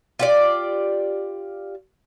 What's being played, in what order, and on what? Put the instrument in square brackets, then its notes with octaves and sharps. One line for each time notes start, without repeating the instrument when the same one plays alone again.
[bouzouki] F4 G4 D5